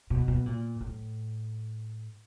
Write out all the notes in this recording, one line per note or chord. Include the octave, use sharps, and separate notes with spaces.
B2
B2
A#2
A2